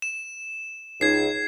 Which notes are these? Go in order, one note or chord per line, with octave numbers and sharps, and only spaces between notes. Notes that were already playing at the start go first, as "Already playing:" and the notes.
E7
C#2 D#4 G#6 C7